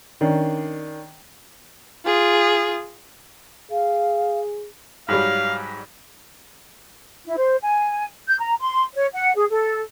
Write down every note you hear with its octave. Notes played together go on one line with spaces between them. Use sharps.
D#3 C#4 D4
F4 G#4
G#4 F5
G#2 F#3 G3 F5
E4
C5
G#5
G6
A#5
C6
C#5
F#5
G#4
A4